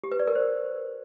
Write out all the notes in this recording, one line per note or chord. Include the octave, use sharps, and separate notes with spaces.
G4
B4
D5
A#4
C5